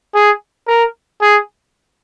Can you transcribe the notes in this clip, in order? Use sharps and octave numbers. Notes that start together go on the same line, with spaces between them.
G#4
A#4
G#4